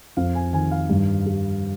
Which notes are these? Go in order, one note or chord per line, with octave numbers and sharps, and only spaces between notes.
F2 F5
G#5
D#3 G#5
F5
G2
G3